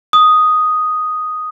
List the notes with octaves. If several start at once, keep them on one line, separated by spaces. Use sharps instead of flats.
D#6